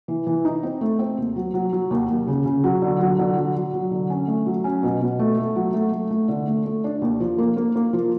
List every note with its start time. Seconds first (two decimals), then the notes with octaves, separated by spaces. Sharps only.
0.08 E3
0.27 E3
0.45 D#4
0.63 C4
0.81 A3
0.99 C4
1.18 D#2
1.36 F#3
1.54 F#3
1.72 F#3
1.90 D#2
2.09 D#2
2.27 C#3
2.46 C#3
2.64 F#3
2.82 D3
3.00 F#3
3.19 D3
3.37 F#3
3.55 F#3
3.73 F#3
3.91 D3
4.10 C#4
4.27 A3
4.46 F#3
4.64 C#4
4.83 B2
5.01 B2
5.19 A3
5.38 A3
5.56 F#3
5.74 A3
5.92 A3
6.10 A3
6.28 D3
6.47 A3
6.66 A3
6.84 D4
7.02 D#2
7.20 F3
7.38 A#3
7.57 A#3
7.76 A#3
7.93 F3